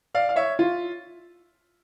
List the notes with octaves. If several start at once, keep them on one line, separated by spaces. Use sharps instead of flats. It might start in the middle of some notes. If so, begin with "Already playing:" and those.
D5 F5
F5
C#5 E5
F4